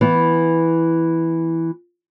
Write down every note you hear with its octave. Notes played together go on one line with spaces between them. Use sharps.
E3 B3 E4